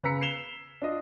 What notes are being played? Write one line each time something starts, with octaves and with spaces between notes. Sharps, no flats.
C#3 B4 A#5 E6 B6 C#7
C7 C#7 E7 F7 G7
D4 F4 D#5